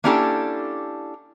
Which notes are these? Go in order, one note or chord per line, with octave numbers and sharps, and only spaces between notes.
A#3 C#4 D4 E4 G4 A4